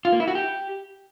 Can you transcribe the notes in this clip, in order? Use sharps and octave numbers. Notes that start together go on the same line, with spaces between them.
F4
A#3
E4
F#4
G4